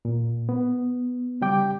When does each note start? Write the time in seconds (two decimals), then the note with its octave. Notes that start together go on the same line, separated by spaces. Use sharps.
0.05 A#2
0.49 B3
1.41 C#3 G3 G4 G5 D6